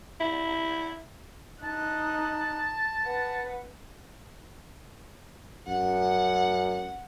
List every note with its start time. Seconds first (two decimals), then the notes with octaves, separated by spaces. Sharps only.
0.20 E4
1.64 D#4 A5 F#6
3.04 B4 F#5
5.68 F#2 F#5